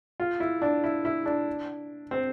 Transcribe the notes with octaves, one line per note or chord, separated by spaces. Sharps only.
F4
E4
D4
E4
E4
D4
C4